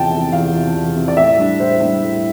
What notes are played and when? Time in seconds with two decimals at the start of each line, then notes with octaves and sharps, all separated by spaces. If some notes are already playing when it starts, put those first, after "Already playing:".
Already playing: E2 C3 F3 G5 A5
0.11 C3 F3
0.32 E2 F5
0.54 C3 F3
0.75 E2
0.96 C3 F3
1.08 D5
1.17 A2 E5
1.38 G3 D4
1.60 A2 C5
1.80 G3 D4
2.02 A2